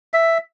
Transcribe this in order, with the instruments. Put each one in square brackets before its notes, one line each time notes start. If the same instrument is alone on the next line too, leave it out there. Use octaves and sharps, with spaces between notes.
[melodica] E5